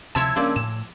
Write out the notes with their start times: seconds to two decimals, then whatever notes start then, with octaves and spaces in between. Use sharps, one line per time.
0.15 D2 C3 F3 E4 C#5 A5 E6 G#6
0.36 G2 C#3 A#3 C#4 D4 C5 D5 G#5
0.56 A2 E7